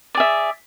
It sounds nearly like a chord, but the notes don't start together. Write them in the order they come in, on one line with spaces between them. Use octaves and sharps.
D5 G#4 E5